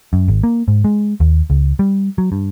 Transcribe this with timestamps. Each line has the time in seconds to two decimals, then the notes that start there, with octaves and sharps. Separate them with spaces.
0.13 F#2
0.28 G#1
0.43 A#3
0.68 G#2
0.84 G#3
1.20 D#2
1.50 C#2
1.79 G3
2.18 F#3
2.32 G2